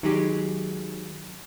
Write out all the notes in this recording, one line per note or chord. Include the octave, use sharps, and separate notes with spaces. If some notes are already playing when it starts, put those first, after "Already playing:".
D#3 F#3 G#3 G4